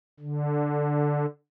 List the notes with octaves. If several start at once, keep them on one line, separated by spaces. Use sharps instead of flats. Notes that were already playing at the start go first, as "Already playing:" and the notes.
D3